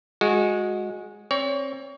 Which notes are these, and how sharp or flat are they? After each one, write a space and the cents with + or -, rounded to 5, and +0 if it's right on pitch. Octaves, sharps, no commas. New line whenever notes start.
G#3 +0 F#4 -20
C4 +35 C#5 +35